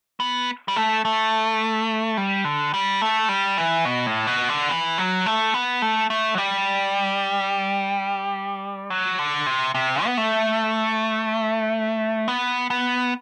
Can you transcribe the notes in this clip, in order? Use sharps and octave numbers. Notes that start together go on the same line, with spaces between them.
B3
G3
A3
A3
G3
D3
G3
A3
G3
E3
B2
A2
B2
D3
E3
F#3
A3
B3
A3
A3
F#3
G3
F#3
D3
C3
C3
B3
A3
B3
B3